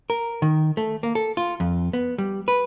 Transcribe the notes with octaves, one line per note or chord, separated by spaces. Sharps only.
A#4
D#3
A3
A#3
A4
F4
F2
B3
G3
B4